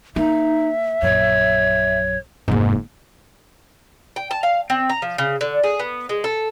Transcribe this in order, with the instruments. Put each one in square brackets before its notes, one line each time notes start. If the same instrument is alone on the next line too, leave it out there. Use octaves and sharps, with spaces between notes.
[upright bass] A#3 [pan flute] D#4 [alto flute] E5
[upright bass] A#1 F#2 [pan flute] C#5
[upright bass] F1 A#3 [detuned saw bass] G#2
[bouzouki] G5
A5
F5
C4
A#5
F3
C#3
D3
G#4
B3
G#3
A4